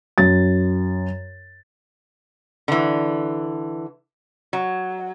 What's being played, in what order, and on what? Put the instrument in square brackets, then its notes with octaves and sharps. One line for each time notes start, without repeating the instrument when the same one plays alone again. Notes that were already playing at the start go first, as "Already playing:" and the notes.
[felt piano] F#2 A6
[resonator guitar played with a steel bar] D3 E3
F#3